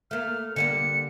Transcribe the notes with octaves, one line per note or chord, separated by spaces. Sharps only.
A3 A#3 F6
D3 G3 A#3 C#7